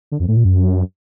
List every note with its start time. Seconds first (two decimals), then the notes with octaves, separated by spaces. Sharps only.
0.12 D3
0.20 F2
0.28 A2
0.36 A#2
0.45 F#2